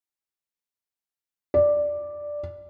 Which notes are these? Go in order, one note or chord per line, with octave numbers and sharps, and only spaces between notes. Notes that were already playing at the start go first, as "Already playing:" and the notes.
D5